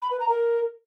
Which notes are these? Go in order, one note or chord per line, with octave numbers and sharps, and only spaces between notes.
B5
B4
A#5
A#4